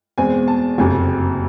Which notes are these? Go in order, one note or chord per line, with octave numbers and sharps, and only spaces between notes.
E2 B2 G#3 C4 G#5
A5
F#1 F2 C3 G#5